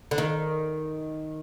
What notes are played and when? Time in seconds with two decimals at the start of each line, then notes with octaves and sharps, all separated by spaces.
0.11 D3
0.18 D#3